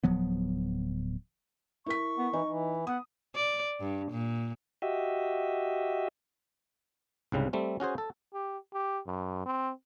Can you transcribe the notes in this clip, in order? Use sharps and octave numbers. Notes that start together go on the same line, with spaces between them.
D1 F3 F#3 B3
E4 A#4 C#6 B6
B3
E3 D#4
E3
B3 F#5 D#6
D5
G2
A#2
F#4 G4 D#5 E5
C2 G#2 C#3 G3
G3 A3 C4
C#4 F#4 G#4 C5
A4
G4
G4
F#2
C4